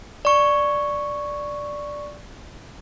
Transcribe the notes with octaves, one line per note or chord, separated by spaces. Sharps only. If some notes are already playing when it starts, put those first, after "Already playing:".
D5 C#6